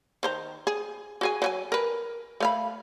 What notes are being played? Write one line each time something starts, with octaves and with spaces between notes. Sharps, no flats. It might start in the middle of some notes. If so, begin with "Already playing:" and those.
D#3 C5 A#5
G#4
F#4 G#4 G#5
F#3 F#4 G#5
A#4 B4
A3 F5 B5